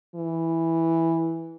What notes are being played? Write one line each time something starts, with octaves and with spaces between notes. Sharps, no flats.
E3